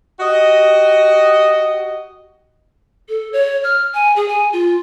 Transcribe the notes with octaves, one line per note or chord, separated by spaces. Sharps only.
F#4 G4 D#5
A4
C#5
F6
G#5
G#4
G#5
F4